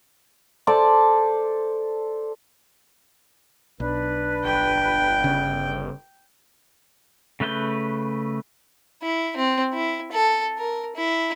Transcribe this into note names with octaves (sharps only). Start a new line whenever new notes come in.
A4 C5 D5 A5
B1 D4 B4
G1 G5
C#3
C#3 A3 B4 C#5 G6
E4
C4
E4
A4
A#4
E4